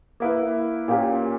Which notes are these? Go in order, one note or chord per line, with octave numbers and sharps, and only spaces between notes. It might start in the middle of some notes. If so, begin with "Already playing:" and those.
A#3 E4 B4
A#2 A#3 C#4 G4